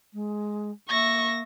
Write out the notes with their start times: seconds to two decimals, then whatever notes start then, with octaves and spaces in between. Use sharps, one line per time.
0.13 G#3
0.89 A#3 E5 C#6 A#6